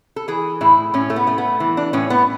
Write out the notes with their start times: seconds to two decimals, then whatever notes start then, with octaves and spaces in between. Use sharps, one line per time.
0.16 A4
0.28 E3 G#4
0.61 A2 E4
0.94 A2 C#4
1.10 A3
1.16 B3
1.27 A3
1.38 B3
1.60 E3
1.77 D4
1.93 A2 C#4
2.10 B3